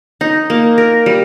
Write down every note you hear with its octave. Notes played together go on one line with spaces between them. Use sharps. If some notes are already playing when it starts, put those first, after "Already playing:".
D#4
A#3
A#4
G3